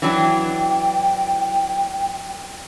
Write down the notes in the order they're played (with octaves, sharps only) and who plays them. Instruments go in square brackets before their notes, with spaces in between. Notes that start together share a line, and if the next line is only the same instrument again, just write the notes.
[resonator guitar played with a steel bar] E3 F#3 D4 [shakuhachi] G5